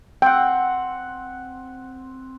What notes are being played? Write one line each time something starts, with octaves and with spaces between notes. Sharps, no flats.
C4 F#5 G5